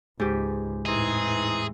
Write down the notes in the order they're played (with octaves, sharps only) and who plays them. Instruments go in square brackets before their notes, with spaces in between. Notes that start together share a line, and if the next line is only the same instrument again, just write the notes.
[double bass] C#2 [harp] G#2 G4
[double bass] E2 A2 [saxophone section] E3 C4 D#4 [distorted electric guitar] G#4